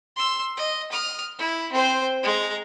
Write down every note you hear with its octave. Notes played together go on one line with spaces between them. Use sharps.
C6 E6
D#5
D#6 F6
E4
C4 C5
G#3 A#5